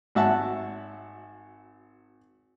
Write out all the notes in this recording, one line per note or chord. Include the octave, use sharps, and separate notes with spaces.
G#1 F#4 E5 F#5 A5